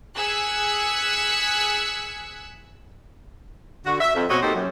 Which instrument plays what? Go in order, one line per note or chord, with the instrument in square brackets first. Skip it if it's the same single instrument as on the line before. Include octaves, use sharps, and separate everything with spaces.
[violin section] G#4 E6 F#6 G#6 B6 C#7
[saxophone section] D3 F#4
E5
F2
B2 C4 F#4 C#5 D#5
A#3 D#4 G4 A4 C5
F#2